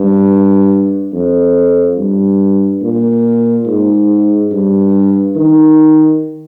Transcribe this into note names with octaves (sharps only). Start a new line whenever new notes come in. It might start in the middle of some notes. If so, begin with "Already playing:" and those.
Already playing: G2
F2
G2
A#2
G#2
G2
D#3